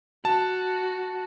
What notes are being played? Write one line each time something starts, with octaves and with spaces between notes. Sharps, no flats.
F#4 A5